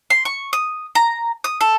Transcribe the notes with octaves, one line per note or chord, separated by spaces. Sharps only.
C6
C#6
D#6
A#5
D#6
A4